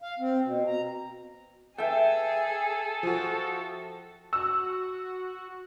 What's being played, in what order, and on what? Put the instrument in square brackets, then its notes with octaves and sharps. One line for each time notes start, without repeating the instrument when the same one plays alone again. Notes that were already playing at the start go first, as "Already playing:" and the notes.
[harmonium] F5
C4
B2
A#5
[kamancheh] G#4 G#5 [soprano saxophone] A4 [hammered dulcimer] E5 G5
[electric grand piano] F3 F#4
[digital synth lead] F#4 [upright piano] E6